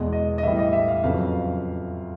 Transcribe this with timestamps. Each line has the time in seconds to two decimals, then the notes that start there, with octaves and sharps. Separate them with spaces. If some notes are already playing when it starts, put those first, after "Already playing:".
Already playing: E2 B2 G#3 D5
0.13 D#5
0.38 D#5
0.43 A2 E3 G3 E5
0.59 D#5
0.73 E5
0.88 F5
1.04 F2 C#3 F#3 B3 F5